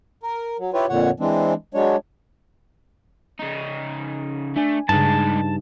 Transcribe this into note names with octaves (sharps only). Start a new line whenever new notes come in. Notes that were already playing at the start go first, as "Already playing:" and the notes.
A#4
F#3
E4 F4 G4 B4 C#5
F2 A#2 D3 C#5 F#5
E3 G#3 C4 D4
F#3 G#3 D4 C#5
C#3 D#4
A3 D4 G#5
G2 C#3 G3 G#3 D#4 A5